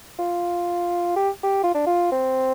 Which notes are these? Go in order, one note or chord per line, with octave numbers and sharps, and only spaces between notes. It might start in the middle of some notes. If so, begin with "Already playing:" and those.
F4
G4
G4
F4
D4
F4
C4